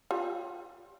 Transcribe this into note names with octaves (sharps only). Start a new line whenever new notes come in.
F4 G4